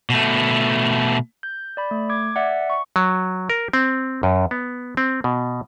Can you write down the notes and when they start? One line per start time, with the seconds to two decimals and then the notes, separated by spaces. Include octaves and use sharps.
0.10 B2 A3
1.43 G6
1.77 D5 B5
1.91 A3
2.10 D6 G#6
2.36 D5 E5 F#5
2.70 C#6
2.96 F#3
3.50 A#4
3.73 C4
4.23 F#2
4.51 B3
4.97 C4
5.24 B2